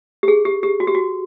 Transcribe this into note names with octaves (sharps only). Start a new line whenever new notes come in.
G4
G#4
G4
G4
F#4
G4
F#4